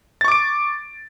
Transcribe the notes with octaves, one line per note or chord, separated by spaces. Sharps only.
C#6 D6 A6 D7